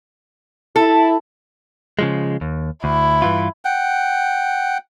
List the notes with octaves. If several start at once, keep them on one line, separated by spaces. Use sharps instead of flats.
E4 A4
C#3 F3 G#3
D#2
D2 E4
G2 E3 F4
F#5 G5